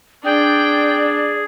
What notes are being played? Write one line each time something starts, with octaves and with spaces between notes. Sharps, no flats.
D4 G#4 D5 G5